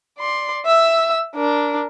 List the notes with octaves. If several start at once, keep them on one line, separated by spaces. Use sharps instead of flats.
D5 C6
E5 E6
D4 A#4